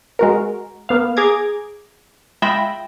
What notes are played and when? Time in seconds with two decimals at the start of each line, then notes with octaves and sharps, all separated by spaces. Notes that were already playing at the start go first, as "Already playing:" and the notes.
0.19 G#3 F#4 A#4
0.89 A#3 B3 F5
1.17 G#4 A#5 D6 G#6
2.42 G#3 F4 E5 G5 B5 A#6